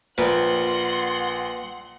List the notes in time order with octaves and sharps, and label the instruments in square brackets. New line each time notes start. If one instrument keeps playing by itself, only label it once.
[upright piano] A#1 [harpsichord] A#4 B4 [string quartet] F#5 C6